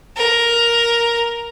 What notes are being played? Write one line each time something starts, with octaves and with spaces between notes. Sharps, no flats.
A#4